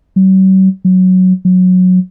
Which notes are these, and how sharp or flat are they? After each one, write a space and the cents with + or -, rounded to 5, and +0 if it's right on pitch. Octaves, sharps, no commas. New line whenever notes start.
F#3 +45
F#3 +0
F#3 -15